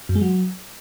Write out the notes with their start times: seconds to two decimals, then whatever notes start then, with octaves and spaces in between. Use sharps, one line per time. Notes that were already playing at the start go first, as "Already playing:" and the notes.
0.09 F#2
0.15 G#3
0.21 F#3